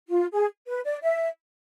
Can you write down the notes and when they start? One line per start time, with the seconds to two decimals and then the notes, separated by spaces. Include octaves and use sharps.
0.08 F4
0.32 G#4
0.67 B4
0.85 D5
1.02 E5